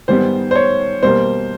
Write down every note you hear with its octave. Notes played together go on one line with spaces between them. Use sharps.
G#2 D#3 G3 B3 C5
C5
C#5
B2 G3 A#3 C5